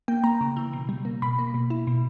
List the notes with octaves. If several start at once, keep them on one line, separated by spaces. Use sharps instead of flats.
A#3 G5
A#3 A#5
C#3
E3
B2
G3
A#3
B2 B5
A#3
B2
E4
B2